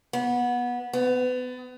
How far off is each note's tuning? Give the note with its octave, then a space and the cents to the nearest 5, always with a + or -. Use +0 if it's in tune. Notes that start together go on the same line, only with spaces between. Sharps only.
B3 -20
B3 +30